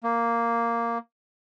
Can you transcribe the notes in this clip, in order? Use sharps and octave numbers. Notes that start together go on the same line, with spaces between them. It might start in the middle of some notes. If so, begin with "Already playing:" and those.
A#3